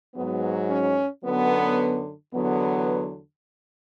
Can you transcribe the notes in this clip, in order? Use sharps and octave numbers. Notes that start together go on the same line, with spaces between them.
G#2 F#3 B3
C#4
F#2 D3 F#3 B3
E2 D3 F#3 B3